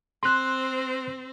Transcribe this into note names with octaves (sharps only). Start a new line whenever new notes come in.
C4 C5 C6 F#6